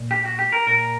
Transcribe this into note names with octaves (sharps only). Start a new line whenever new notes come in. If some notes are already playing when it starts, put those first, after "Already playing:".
Already playing: A#2
G4
F#4
G4
A#4
A#2 A#4